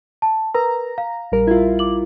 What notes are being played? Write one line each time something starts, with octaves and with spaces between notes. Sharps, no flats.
A5
A#4 B4 A#5
F5
A#1 G3 A#4
E4 F4
D6 F#7